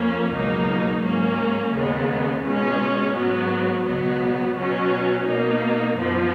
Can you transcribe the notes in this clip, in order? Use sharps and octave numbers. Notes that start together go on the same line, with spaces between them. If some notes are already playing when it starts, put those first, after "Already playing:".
Already playing: F2 F3 A#3 C#4
C#2 B2 F#3 A#3 D#4
G#2 F#3 A#3 C#4
D#2 C#3 G#3 B3
C#2 B2 G#3 C#4
G#2 F#3 B3
C#2 B2 F#3 B3
B2 F#3 C#4
B2 A#3 D#4
F#2 F3 B3